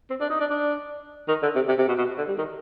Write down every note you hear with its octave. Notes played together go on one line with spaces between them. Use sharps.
C4
D4
D#4
D4
D4
D#3
D3
C3
C3
C3
B2
B2
D3
G3
D#3